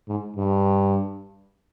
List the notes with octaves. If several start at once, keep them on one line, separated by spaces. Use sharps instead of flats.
G#2
G2